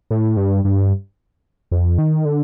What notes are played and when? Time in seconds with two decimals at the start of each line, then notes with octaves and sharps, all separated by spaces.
0.11 A2
0.37 G2
0.65 G2
1.71 F2
1.98 D#3
2.25 D3